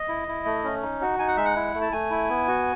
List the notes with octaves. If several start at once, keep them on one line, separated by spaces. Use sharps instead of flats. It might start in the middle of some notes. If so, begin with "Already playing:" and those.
Already playing: D#5
E4
E4
A3
C#4
D#4
F#4
D#4 G#5
F#5
G#3 E5
F#5
E4
A3
A5
A3 G#5
E4
B3
F#4